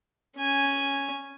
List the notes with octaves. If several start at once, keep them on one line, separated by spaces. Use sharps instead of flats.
C#4 G#5